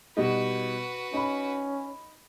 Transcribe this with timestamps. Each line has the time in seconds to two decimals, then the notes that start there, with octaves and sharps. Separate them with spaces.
0.17 B2 G3 D#4 F#4 B4
1.13 C#4 D#4 B5